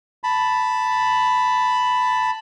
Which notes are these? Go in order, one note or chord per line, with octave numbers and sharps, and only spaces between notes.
A5 B5